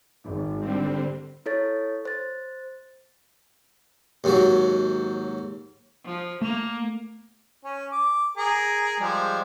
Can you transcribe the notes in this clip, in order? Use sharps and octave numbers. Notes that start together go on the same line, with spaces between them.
G#1
D3 G3 C4
E4 A4 C#5 A6
C5 A6
D#2 G#2 F#3
F3
A3 A#3
C#4
D6
G#4 A#4
F3 G3 G#3